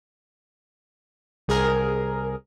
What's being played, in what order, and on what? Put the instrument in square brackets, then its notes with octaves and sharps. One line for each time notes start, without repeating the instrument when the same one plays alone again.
[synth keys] C2 G#4 A#4